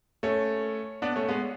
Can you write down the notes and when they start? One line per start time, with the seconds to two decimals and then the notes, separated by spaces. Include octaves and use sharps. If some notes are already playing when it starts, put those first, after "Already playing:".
0.23 A3 C#4
1.02 B3 D4
1.16 A3 C#4
1.28 G#3 B3